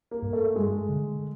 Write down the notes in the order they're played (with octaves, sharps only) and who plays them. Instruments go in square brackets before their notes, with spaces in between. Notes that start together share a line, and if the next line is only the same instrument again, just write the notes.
[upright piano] A#3
[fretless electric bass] G2
[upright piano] A3
[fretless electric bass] G3 [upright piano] G#3
[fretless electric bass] D3